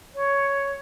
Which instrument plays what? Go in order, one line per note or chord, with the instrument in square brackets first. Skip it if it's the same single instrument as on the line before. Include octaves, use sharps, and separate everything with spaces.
[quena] C#5